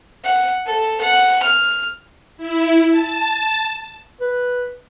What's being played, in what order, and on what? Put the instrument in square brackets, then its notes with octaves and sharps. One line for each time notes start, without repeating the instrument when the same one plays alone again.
[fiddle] F#5
A4
F#5
F6
[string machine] E4
A5
[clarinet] B4